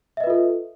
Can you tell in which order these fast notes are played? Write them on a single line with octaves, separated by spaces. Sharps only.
E5 D#5 B4 F4 A4